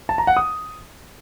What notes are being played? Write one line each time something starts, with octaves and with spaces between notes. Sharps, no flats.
A5
A#5
F#5
D#6